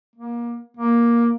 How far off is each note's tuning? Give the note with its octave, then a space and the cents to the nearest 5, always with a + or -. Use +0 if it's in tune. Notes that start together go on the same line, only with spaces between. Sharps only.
A#3 +25
A#3 +10